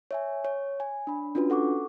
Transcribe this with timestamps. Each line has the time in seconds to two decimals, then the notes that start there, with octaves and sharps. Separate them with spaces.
0.11 C#5 E5 G#5
0.45 C#5
0.80 G#5
1.07 D4 B5
1.35 C#4 D4 F4 F#4 B4
1.50 A4 F#5 C#6 D6